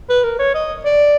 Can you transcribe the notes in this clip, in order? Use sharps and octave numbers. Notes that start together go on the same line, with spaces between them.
B4
A#4
C#5
D#5
D5